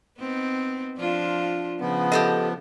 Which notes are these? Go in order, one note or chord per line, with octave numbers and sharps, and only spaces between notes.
B3 C4 D#4
F3 D4 F4
C#3 F3 B3
G4 A4 D#5